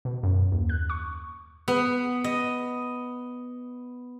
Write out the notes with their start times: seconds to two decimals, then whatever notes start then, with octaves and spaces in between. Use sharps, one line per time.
0.05 B2
0.23 F#2
0.52 D#2
0.69 F#6
0.90 C#6
1.68 B3
2.24 D#5